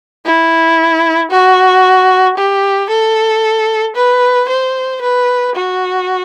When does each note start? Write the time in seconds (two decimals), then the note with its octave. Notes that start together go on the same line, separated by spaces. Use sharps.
0.25 E4
1.31 F#4
2.37 G4
2.89 A4
3.96 B4
4.49 C5
5.01 B4
5.55 F#4